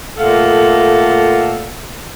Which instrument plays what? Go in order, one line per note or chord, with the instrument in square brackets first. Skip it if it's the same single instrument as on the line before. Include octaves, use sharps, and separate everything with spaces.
[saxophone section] A#2 A3 A4 F5 F#5